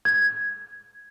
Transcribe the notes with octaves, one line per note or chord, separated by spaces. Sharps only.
G#6